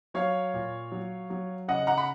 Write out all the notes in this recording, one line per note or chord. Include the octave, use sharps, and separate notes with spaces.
F#3 C#5 F5
A#2
F#3
F#3
C#3 D#5 F#5
F#5 A#5
B5